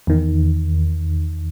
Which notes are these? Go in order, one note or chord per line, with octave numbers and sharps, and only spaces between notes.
E2 D#3